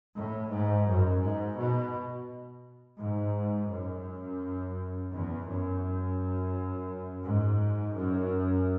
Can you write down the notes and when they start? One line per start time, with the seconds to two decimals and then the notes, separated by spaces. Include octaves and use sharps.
0.16 A2
0.51 G#2
0.88 F#2
1.23 G#2
1.58 B2
3.00 G#2
3.71 F#2
5.12 E2
5.48 F#2
7.25 G#2
7.95 F#2